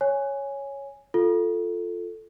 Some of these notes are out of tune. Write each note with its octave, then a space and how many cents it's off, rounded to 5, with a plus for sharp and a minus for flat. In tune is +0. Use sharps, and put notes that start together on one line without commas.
C#5 +0 G#5 +0
F4 +0 A4 +0